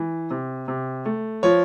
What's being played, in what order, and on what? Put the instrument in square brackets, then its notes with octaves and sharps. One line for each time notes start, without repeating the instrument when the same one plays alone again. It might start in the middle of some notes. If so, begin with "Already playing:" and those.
Already playing: [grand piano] E3
C3
C3
A3
F3 C#5